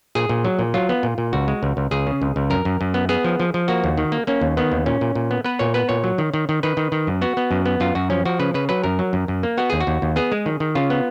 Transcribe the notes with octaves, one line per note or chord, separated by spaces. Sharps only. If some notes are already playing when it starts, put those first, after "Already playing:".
A#2 G#4
A#2
F#3
A#2
F#3 F4
B3
A#2
A#2
C#2 F#4
G#3
C#2
C#2
C#2 G#4
C#3
C#2
C#2
F#2 A#4
F#2
F#2
B3
B3 G#4
F3
F3
F3
A#3 F#4
D#2
D#3
A#3
A#3 C#4
D#2
D#3 B3
D#2
A#2 C#4
A#2
A#2
B3
B3 B4
A#2 C#5
B3 B4
A#2 C#5
F#3
D#3
D#3
D#3
D#3 B4
D#3
D#3
F#2
B3 F#4
B3
F#2
B3
F#2 F4
F#2 F#4
F3 C#4
F3 F#4
C#3 B4
C#3 B4
F#3 B4
F#2 A#4
F#3
F#2
F#2
A#3
B3 F#4
D#2 G#4
F#4
D#2
D#2
B3 G#4
G#3
D#3
D#3
C#3 F4
B3